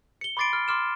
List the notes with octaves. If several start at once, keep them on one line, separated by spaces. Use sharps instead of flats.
C#7 G7
B5 C6 D6 A6 C7 D7
F6
C6 D6 F6 E7